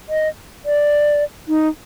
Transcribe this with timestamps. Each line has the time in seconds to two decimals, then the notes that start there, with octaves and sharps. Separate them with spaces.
0.09 D#5
0.65 D5
1.48 D#4